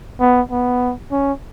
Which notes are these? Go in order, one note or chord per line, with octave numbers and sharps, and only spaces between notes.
B3
B3
C#4